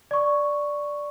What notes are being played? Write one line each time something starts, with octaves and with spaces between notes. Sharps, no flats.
D5 C#6